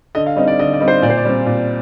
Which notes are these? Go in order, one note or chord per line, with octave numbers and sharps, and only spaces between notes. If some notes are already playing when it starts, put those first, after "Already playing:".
D3 D#5
F5
G3 C4 D#4 D#5
D5
D3 D#5
D5
G3 C4 D#4
C5
A#2 D5
C5
D5
G3 C4
A#2